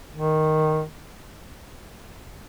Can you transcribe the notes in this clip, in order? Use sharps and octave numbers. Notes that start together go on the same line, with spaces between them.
D#3